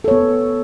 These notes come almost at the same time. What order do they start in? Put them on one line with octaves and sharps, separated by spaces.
A4 C#5 B3